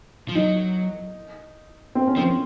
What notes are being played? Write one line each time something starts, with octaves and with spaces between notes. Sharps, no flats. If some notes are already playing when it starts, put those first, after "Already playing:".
F3
F#3 D#4
C4
C#4
F3 C4